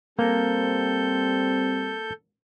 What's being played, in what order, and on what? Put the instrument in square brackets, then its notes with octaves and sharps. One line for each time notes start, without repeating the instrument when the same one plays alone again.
[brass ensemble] G3 C4 [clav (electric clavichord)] A#3 [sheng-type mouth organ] A4 G6